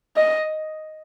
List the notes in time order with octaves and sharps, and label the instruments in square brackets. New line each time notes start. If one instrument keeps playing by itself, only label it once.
[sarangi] D#5